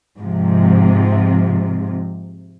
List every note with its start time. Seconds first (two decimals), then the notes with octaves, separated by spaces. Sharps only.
0.19 G#2 C3 F3